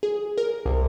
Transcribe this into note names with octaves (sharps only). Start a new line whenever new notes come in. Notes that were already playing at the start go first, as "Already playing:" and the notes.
G#4
A#4
C2